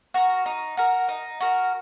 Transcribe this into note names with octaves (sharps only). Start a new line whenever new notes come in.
F#4 A#4
D#4
F#4 A#4
D#4
F#4 A#4